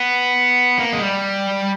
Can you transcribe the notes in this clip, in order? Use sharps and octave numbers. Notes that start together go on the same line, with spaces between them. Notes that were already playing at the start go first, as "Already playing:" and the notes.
Already playing: B3
A#3
G#3
G3